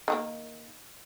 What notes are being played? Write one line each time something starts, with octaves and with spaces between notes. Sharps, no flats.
D#3 G#3 A#3